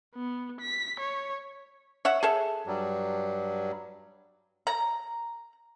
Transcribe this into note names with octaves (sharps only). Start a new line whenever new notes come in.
B3
B6
C#5
C#5 E5 F#5
G#4 A4 E5
G2 F#3 G3
A#5